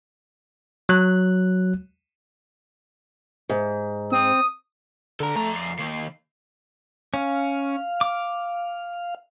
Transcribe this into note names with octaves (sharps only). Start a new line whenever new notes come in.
F#3 F#6
G#2
C4 D#6
D3 A4 A#5
F2 A3 A#5
C7
D#3 A#3 C7
C#4 F5
D6